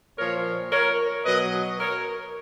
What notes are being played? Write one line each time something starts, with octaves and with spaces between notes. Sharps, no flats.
A#2 F3 A#4 C#5
A#4 C#5
B2 F#3 B4 D#5
A#4 C#5